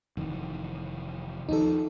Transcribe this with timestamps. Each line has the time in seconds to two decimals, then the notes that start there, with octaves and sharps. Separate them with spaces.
0.17 F1 D#3 E3
1.49 D#2 F3 D#4 A4